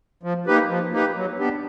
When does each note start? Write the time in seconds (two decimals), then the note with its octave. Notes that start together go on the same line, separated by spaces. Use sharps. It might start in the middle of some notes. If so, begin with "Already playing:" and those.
0.23 F3
0.47 A#3 D#4 G4 B4
0.69 F3
0.92 A#3 D#4 G4 B4
1.16 F#3
1.39 B3 D4 G4